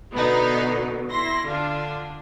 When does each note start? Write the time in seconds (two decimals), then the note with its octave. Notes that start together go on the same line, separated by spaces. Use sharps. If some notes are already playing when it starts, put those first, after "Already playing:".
0.14 B2 D3 F#3 B3 D#4
1.09 E4 C6 A#6
1.46 D3 D4 F4